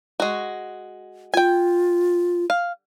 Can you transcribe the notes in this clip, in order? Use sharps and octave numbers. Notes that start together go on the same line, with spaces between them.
G#3 F#4
F4 G5 G#5
F5